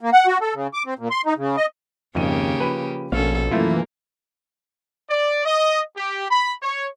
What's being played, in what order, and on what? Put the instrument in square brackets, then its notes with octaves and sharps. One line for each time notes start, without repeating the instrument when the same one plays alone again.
[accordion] A#3
F#5
F#4
A4
C#3
D6
C4
A#2
C6
D#4
C#3
D#5
[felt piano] G#1 D#7 [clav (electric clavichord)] F2 [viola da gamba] C#3 A#3 G4
[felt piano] F3 B5 D#7 [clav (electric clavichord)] B4
[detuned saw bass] A#1 [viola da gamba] B2 C#4 A4 [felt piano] A#3 [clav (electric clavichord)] F5
[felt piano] F#2 F3 [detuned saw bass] E3 [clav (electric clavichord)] A3 E4 F4 [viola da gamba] A#3
[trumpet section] D5
D#5
G4
B5
C#5